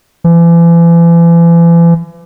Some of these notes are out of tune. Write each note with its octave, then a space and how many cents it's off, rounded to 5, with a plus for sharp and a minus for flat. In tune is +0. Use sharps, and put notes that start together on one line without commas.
E3 +40